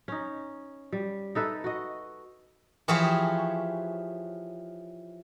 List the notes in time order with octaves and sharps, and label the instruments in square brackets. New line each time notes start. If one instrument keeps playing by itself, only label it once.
[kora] C#4 D#4
G3
D#4 A4 B4 E5
F#4 D#5
[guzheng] E3 F3 G4 G#4 C5 C#5